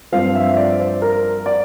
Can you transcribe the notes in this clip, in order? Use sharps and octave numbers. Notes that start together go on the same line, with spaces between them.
G2 F3 C4 F5
E5
D5
C5
A#4
D5